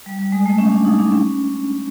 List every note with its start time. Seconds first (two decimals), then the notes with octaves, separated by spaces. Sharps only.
0.06 G3
0.19 G3
0.32 G#3
0.46 A3
0.58 C#4
0.72 D4
0.85 D#4
0.99 D4
1.12 C#4